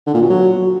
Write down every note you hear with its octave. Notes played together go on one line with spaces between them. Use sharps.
D3
A#2
B2
F#3